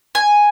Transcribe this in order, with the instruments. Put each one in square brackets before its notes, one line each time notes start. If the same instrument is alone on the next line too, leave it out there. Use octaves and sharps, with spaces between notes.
[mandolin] G#5